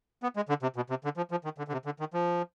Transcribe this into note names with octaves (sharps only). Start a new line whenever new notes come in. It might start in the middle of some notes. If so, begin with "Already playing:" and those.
B3
G#3
D3
C3
B2
C3
D3
F3
F3
D#3
D3
D3
C3
D3
D#3
F3